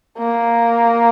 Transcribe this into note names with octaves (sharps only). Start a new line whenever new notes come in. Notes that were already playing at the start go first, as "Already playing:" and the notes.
A#3